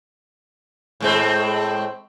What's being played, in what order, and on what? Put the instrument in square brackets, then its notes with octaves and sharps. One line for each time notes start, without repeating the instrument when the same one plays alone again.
[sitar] A2 G#3 C4